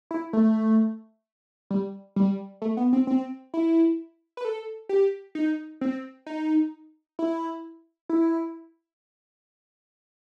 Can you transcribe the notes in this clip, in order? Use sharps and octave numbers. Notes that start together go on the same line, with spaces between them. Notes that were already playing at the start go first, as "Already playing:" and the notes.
E4
A3
G3
G3
A3
B3
C4
C4
E4
B4
A4
G4
D#4
C4
D#4
E4
E4